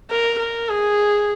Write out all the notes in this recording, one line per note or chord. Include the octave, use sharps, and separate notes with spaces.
A#4
A#4
G#4